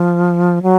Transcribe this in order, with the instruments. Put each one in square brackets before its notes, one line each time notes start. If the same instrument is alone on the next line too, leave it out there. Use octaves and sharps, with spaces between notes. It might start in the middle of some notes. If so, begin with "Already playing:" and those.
Already playing: [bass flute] F3
F#3